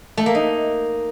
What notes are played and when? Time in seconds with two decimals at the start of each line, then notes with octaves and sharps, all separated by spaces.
0.17 A3
0.26 A#3
0.35 D#4